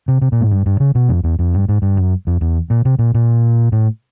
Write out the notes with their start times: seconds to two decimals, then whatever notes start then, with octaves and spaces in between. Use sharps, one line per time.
0.08 C3
0.22 C3
0.32 A#2
0.41 G#2
0.52 G2
0.66 G2
0.80 C#3
0.95 B2
1.09 F2
1.24 E2
1.39 F2
1.54 G2
1.69 G#2
1.82 G2
1.97 F#2
2.27 F2
2.41 E2
2.70 A#2
2.85 C3
2.99 A#2
3.14 A#2
3.72 A2